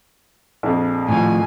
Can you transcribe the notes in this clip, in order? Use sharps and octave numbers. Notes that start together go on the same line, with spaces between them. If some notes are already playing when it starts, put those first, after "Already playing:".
A#1 F2
A2 F3 G#5